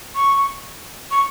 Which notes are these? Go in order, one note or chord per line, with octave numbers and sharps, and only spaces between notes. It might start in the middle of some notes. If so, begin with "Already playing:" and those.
C#6
C#6